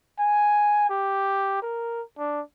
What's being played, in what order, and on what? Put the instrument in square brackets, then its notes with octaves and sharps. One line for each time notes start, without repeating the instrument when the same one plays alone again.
[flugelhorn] G#5
G4
A#4
D4